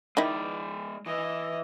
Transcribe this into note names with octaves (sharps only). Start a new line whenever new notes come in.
D#3 G#3 D#4 E4 D5
E3 D#5